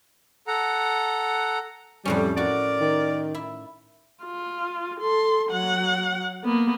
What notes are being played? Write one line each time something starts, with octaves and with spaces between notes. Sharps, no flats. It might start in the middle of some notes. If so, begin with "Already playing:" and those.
A4 F#5 A#5
F2 A2 G3 C#4
F#4 A#4 D5
D#3
E4
F4
A4 C6
F#3 F#5
A#3 B3